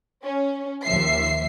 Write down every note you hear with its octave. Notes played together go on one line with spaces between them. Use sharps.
C#4
D#2 F3 E5 C7